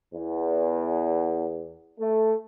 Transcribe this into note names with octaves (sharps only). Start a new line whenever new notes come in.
E2
A3